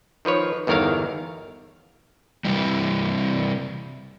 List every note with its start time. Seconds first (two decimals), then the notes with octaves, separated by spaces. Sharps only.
0.25 D#3 F3 B4 C#5
0.67 G1 E2 D#3 A#4 C#5 F5
2.45 C3 E3 G3